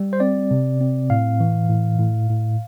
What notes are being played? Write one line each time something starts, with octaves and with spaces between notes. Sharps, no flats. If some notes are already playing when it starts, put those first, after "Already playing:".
Already playing: G3
C5
C4 D5
C3
C4
A2 F5
E3
A2
A2
A2